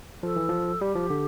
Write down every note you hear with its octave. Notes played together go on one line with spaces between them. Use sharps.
F3 A4
E3
F3
G3 G4
F3
D3